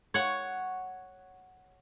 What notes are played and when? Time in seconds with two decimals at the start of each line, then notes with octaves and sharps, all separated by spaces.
0.14 C#5 F#5